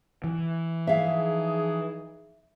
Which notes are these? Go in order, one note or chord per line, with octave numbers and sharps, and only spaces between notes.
E3
F3 D#4 G#4 E5 F5